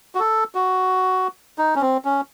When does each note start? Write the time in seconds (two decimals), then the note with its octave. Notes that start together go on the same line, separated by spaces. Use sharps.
0.15 F#4
0.20 A4
0.55 F#4
1.58 D#4
1.75 C#4
1.81 C4
2.05 C#4